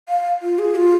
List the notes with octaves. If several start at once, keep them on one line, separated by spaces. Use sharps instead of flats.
F5
F4
G#4
F4